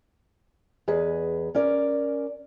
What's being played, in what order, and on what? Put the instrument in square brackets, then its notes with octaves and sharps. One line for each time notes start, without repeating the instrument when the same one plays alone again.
[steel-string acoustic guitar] E2 G#4 B4 D#5
C#4 A#4 D5